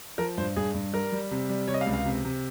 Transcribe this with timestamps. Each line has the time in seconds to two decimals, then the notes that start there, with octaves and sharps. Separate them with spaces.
0.18 F3 A#4
0.38 G2 C5
0.56 G2 G#4
0.74 G2
0.93 G3 A#4
1.12 G3
1.31 C3
1.49 G3
1.68 C3 C#5
1.74 D#5
1.81 F5
1.86 C#2
1.93 F5
2.05 C3
2.25 C3